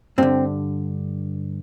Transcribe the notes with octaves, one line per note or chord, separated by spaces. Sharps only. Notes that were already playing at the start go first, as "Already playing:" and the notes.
G2 D3 C4